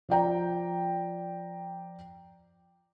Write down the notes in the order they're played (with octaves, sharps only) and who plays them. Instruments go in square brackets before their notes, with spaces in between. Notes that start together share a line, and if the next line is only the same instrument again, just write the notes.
[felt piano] F3 D5 G5 A#5